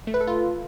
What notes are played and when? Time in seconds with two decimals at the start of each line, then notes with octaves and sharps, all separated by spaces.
0.07 A3
0.14 B4
0.21 A4
0.27 F4